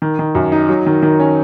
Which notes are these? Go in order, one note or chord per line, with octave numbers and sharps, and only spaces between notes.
D#3
D#3
F#2
D#4
F#3
D#3
D#3
C#4